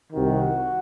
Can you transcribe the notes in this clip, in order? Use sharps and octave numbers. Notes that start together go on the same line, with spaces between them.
C2 C3 D#3 F#4